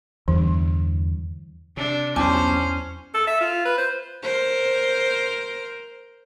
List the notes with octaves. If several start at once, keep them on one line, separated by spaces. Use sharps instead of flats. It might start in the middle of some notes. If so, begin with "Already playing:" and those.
E2 G2 D3 E3
C3 D4
B1 E2 G2 C#4 C5 A5 D6
A4
E5
F4
B4
C5
A#4 C5